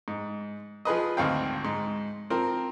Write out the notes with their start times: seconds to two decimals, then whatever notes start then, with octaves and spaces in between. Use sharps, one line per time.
0.08 G#2
0.85 F3 G#4 B4 D#5
1.17 G#1 D2 C4 F5 G5
1.65 G#2
2.30 F3 C4 A#4